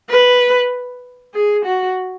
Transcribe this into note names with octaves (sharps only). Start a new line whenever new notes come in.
B4
G#4
F#4